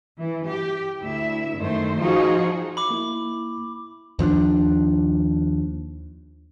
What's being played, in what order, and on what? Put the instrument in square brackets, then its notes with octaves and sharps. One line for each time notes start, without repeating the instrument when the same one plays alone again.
[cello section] E3
G4
D2 E4 E5
F#2 D#3 A3 C5
F3 D#4 F4 F#4 G#4
[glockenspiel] B5 D6
[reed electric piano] A#3 E4
[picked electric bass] D#2 F3 C4 D4